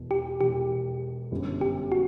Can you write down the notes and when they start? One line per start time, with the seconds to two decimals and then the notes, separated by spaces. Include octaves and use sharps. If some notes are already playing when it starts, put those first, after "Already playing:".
Already playing: E1 E2 B2
0.11 G4
0.41 E1 E2 B2 G4
1.32 G1 F#2 D3 G3
1.61 G4
1.92 F#4